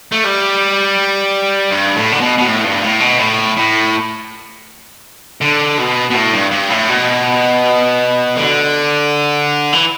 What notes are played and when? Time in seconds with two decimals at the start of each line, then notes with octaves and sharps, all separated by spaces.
0.12 A3
0.24 G3
1.71 G2
1.96 A2
2.12 D3
2.20 B2
2.38 B2
2.45 A2
2.64 G2
2.82 A2
3.00 B2
3.19 A2
3.57 A2
5.41 D3
5.78 B2
6.10 B2
6.14 A2
6.33 G2
6.51 G2
6.70 A2
6.89 B2
8.36 D3
9.72 E3